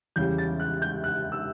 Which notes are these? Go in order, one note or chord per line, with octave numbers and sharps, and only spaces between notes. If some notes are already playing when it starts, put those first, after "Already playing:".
E2 C#3 G3 G6
A6
F#6
G6
F#6
E6